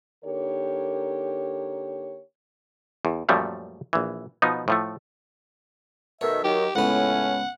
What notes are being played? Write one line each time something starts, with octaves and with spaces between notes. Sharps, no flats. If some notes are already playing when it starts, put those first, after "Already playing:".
D3 A#3 D#4 G4 A#4 C#5
E2
F#2 A#2 F3 G3 A3 C#4
A#1 E3
B2 F3 B3 D#4
A2 F3 A3
B2 D#3 A3 C#5 E5
D#3 F#3 G4
C#2 A2 B3 C#4 F#5